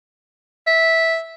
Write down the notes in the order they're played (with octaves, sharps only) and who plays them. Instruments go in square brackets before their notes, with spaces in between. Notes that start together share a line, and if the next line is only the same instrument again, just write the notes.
[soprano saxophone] E5